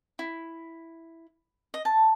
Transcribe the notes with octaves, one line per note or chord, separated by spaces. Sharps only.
E4
D#5
A5